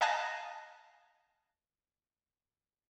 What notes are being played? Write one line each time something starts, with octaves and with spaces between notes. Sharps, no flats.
D#5 F5 G#5 A5 F#6 A#6